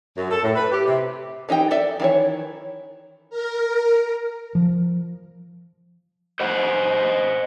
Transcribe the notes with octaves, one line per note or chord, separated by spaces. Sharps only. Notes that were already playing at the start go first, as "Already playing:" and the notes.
F#2
A4
A2
B4
G4
C3
E3 D#4 G4 G5
A4 D5 E5
D#3 E3 C#5
A#4
F3
C5 D#5 F#5